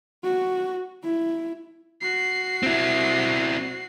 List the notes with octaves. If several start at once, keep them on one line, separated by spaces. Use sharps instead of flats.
F#4
E4
F#4 C7
C4 E4